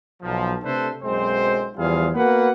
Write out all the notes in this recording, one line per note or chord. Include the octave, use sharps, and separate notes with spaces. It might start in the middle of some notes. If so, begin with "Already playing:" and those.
B1 F3
C3 A3 D4 A4 B4 C5
B1 F#2 G#3 C4 C5
E2 F3 G3 F4 G#4 F5
A#3 B3 F#4 B4 F#5